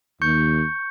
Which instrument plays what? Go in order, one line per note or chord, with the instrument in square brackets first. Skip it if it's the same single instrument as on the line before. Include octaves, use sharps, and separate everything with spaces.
[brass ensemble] D#2 [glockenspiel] C#6 G6 C#7